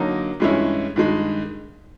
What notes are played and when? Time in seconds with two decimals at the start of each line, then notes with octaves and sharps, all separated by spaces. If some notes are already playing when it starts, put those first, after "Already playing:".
Already playing: D3 F#3 A#3 D#4
0.40 G2 E3 G#3 C#4 E4
0.96 G2 D#3 G#3